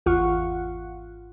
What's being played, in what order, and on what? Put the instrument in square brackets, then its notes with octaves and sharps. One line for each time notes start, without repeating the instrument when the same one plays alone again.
[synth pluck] G#1 E2 F4 F5 F#5 C#6